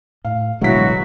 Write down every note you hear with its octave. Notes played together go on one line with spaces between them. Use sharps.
A2 F5
A1 B2 D3 F#3 G#3 E4 F#4 B6